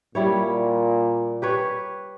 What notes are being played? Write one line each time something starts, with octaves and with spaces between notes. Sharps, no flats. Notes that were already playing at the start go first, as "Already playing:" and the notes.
A#2 G3 E4 C#5
G4 B4 C#5